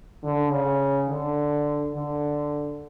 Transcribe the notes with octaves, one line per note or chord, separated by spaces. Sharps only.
D3
C#3
D3
D3